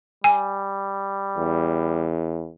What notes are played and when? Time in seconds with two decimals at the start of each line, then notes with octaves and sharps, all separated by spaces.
0.24 G3 G#5
1.37 E2